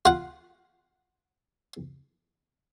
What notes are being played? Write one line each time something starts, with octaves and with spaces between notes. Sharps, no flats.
F4 F#5